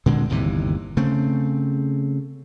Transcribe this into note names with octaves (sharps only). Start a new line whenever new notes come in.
A#2 D3 G#3 C4
G1 D#2 C3 E3
C#3 A3 C4